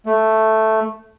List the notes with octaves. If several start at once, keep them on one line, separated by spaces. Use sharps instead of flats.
A3